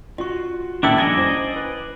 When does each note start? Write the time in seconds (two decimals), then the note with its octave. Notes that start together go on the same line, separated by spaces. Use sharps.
0.18 F4 F#4 D#5 C#6
0.83 A#2 D#3 B3 C#4 D4 E4 A4 E6
0.98 F2 G3 D4 D5 D#5 G#5 A#5
1.18 E4 C5
1.56 B4